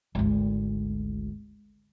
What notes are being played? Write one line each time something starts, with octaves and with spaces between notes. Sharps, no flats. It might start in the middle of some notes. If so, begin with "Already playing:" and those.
G#1 D2